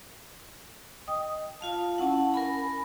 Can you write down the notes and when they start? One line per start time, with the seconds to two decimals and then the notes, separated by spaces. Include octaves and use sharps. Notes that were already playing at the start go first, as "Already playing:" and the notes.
1.08 D#5 G5 D#6
1.61 F4 F5 A5
1.98 C#4 E4 F5 F#5 A5
2.34 A#4 G#5 B5